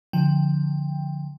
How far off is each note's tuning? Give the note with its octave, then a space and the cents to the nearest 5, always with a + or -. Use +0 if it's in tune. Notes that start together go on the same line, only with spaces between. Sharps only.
D3 -10 F3 +0 G5 +10